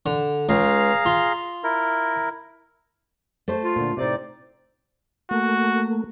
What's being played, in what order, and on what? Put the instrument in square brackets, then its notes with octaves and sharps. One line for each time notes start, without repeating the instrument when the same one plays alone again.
[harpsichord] D3
[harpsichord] C#2 [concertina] G#4 F5 A#5
[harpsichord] F4
[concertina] E4 A#4
[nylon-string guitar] A3 C5
[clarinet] F4
[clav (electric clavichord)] A#2 D3
[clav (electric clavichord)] A2 C3 [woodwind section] C4 D#4 D5
[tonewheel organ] A3 A#3 [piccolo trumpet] F#4